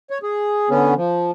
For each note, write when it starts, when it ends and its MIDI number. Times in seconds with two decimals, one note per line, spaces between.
0.10 0.18 73
0.23 0.69 68
0.70 0.94 50
0.70 0.94 59
0.70 0.94 61
0.96 1.31 53